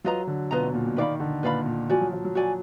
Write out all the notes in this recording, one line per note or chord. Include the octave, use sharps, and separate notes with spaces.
F#3 F4 B4 D#5 A#5
D3
B2 F4 B4 D#5 A#5
B2
A#2
B2
D#3 B4 D5 F5 B5
D3
A#2 B4 D5 F5 B5
A#2
F3 F#4 D5 G#5
F#3
F3
F#3
F#4 D5 G#5